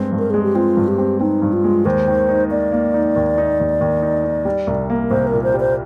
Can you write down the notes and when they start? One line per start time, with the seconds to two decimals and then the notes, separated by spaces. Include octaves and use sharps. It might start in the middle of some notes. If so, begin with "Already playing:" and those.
Already playing: G2 G#3 C4
0.12 G2
0.18 A#4
0.30 G#3 G#4
0.43 G4
0.55 C4 F4
0.77 G2
0.88 G4
0.98 C4
1.21 C4 D#4
1.42 G2
1.53 F4
1.64 G#3
1.85 D#2 C5
2.08 D#3
2.29 D#4
2.50 A#3 D5
2.72 A#3
2.94 D#4
3.16 D#2
3.38 D#4
3.59 D#2
3.81 D#2
4.02 D#4
4.24 D#4
4.45 G3
4.67 C2
4.90 A#3
5.10 C2 C5
5.27 A#4
5.32 A#2
5.43 C5
5.54 G3
5.60 C5